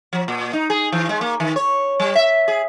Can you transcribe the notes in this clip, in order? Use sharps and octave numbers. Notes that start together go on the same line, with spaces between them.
F3
A#2
D#4
G#4
E3
G#3
A#3
D#3
C#5
G3
E5
G#4